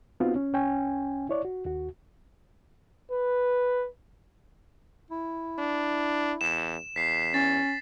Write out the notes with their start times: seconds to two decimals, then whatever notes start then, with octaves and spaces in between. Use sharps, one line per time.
0.20 B3 C4 D#4 F4 F#4
0.36 C#4
0.53 C2 C#4 G5 G#5
1.29 E4 C#5 D5
1.45 F#4
1.65 D#2 F#4
3.11 B4
5.11 E4
5.59 D4
6.41 E2 E7
6.96 E2 B6 C7
7.34 C#4 A6